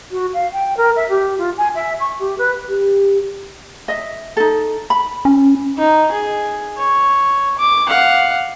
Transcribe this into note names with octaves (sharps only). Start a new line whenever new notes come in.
F#4
F5
G5
A#4
E5
G4
F4
G#5
E5
C#6
G4
B4
G4
D#5 E5
D#4 A4
B5
C#4
D#4
G#4
C#5
D6
F5 F#5